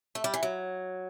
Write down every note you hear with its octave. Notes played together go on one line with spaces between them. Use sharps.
A3
G3
E3
F#3